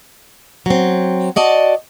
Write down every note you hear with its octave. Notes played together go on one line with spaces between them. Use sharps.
F#3 C4
F#4 D5 D#5 A5